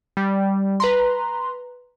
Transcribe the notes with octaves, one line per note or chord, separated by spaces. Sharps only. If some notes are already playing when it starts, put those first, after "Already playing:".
G3
B4 A#5 C6